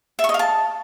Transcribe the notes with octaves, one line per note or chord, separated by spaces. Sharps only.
E5
C#6
D#5
F5
A5